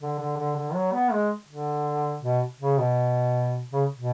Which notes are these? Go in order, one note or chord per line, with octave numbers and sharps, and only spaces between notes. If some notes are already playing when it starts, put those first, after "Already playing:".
D3
D3
D3
D3
F#3
B3
G#3
D3
B2
C#3
B2
C#3
B2